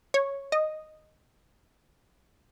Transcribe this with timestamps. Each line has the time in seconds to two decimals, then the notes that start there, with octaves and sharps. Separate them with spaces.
0.14 C#5
0.52 D#5